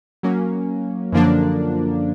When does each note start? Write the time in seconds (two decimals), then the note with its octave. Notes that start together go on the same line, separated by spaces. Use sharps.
0.23 F#3 A#3 C#4
1.12 F#2 D3 F3 A#3 D4